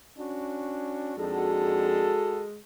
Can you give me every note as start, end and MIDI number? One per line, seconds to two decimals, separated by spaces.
0.18 1.15 61
0.18 1.15 62
0.18 1.15 66
1.18 2.15 41
1.18 2.59 56
1.18 2.15 62
1.18 2.15 63
1.18 2.45 66
1.18 2.45 69